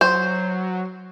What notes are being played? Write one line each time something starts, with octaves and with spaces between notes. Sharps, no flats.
F#3 C5